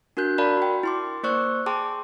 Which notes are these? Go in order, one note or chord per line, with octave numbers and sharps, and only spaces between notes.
D4 F#4 A#4 F#6 G6
A#4 D5 F5 A5 B5
F#4 G5
E4 C6 D6
A#3 C5 D5 C#6 E6 F#6
G#4 G5 A5 C6 D6